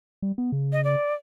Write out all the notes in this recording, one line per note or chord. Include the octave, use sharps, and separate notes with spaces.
G3
B3
C#3
D#5
D5